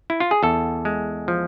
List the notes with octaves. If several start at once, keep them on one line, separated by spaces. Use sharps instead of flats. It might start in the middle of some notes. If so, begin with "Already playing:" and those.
E4
F4
G#4
E2 A4
G#3
F3